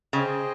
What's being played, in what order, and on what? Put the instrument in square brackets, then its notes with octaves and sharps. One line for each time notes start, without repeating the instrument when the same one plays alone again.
[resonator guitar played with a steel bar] C#3 [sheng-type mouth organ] G#4 C5 D#5 G5